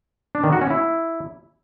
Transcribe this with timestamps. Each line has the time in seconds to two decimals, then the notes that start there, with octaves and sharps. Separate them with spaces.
0.35 D4
0.44 D#3
0.53 F#4
0.61 C#4
0.70 E4